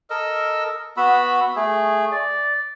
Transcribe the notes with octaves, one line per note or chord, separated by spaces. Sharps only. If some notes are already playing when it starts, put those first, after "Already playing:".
A4 A#4 D#5 E6
B3 F#4 B5 E6
A3 G#4
D5